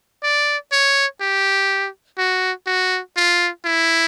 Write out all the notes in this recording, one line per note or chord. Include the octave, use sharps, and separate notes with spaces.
D5
C#5
G4
F#4
F#4
F4
E4